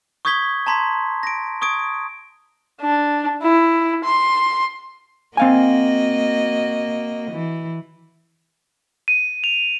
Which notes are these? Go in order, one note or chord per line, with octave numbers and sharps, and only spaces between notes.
C#6 D#6 G6 G#6 B6 G7
A5 A#5 C6 G#6 B6
A#6 D7
C#6 D#6 G#6 D7
D4
E4
C6
A#3 C4 F#4 D#5 F5 G#5
E3
D#7
F7